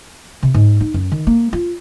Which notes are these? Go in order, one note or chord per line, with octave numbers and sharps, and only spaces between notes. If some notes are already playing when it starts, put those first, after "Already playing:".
C3
G#2
D#4
F#2
D#3
A#3
F4